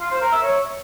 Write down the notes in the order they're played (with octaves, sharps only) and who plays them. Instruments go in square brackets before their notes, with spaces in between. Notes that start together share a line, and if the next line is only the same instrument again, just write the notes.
[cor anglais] F4
C5
A#4
E5
C#5